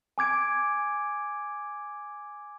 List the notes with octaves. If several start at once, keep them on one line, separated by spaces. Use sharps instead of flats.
G#5 D6 G#6 D7